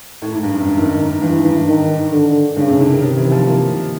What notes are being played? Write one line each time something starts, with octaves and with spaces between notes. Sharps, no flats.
A2
G#2
G2
F#2
G2
F#2 D#3
G2 E3
G#2
G2
D#3
D3
G2 C#3
C3
D3
D#3
C3 D#3
E3
F3
A#3